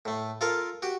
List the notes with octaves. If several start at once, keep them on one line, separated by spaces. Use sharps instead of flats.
A2 A3
F4 A4 A#4 F5
F#4 G4